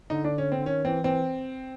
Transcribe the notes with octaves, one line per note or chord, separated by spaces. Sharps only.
D3 D#4
D4
C#4
C4
D3
D#3 C#4
E3 C4
E3 C4